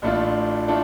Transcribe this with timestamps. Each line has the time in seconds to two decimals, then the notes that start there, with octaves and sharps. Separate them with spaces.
0.02 A1 A2 A3 D4 F4
0.68 A2 A3 D4 F4